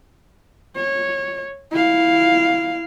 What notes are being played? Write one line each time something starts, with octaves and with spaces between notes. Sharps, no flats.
C#5
E4 F5